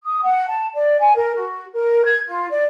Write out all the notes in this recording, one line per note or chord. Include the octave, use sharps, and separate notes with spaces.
D#6
F#5
A5
D5
G#5
A#4
F#4
A#4
G#6
F4
D5